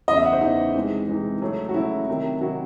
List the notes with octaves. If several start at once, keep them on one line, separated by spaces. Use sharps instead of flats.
E2 C#3 E3 D#5
E5
F#5
C5
E2 C#3 E3 D#4
C3 E3 G#3
C3 E3 G#3
C#3 F#3 A3 C#4
F#4
C#3 F#3 A3 C#4 E4
C3 D#3 F#3
C3 D#3 F#3 F#4